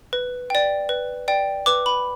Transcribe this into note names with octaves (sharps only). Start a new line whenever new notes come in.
B4
D5 G5
B4
D5 G5
B4 D6
B5